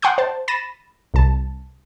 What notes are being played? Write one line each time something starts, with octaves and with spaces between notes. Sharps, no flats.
F#5 G5 C6 C#6 D#6 G6
C5 A5
B5 A6 A#6 D#7 E7
C2 A5